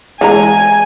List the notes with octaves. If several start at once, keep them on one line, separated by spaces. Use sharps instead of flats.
E3 G#3 G#5 A#5